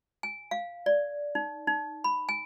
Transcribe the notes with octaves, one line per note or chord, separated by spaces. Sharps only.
G#5
F5
D5
D#4
D#4
B5
G#5